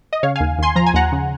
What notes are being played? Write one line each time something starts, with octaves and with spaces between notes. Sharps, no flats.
D#5
C#3 C#5 F5
F5 G#5
D#2
D#2 G#5 C6
F3 A#5
G#5
D#2 F#5 A#5
C#3